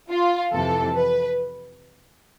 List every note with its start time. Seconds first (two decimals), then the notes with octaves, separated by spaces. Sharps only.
0.09 F4
0.52 F2 C3 E3 A4
0.96 B4